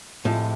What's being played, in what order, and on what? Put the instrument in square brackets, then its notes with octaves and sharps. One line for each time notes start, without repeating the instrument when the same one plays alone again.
[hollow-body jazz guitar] A2 [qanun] C3 F3 G#3